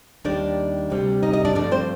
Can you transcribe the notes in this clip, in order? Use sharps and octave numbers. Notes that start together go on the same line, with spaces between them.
D#2 D#3 G3 D4 D5
D2 C3 G3
D#4 D#5
D#4 D#5
D4 D5
G2 F3 A3 D4 D5
C4 C5